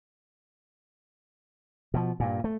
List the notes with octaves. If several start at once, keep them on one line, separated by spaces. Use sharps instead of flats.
B2 F3
G2 A#2
A3